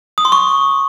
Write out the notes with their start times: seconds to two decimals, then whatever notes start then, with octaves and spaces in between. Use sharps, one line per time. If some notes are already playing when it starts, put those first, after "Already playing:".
0.18 D#6
0.25 C6
0.32 C#6